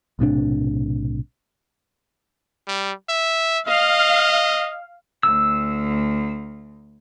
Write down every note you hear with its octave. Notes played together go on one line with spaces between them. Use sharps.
B1 A2 C3 D4
G3
E5
D#5 F5
D2 E6